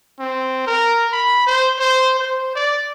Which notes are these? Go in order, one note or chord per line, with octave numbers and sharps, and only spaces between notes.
C4
A#4
B5
C5
C5
C5
D5